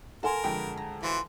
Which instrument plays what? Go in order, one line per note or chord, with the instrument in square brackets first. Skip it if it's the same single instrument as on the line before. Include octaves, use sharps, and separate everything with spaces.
[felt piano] A4 F#5 G#5 [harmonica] A#4 [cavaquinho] A5 C6
[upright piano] F2 D3 G#3 [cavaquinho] B4 G5 C#6
[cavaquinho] A#5
[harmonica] E3 [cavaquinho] F4 F#4 C5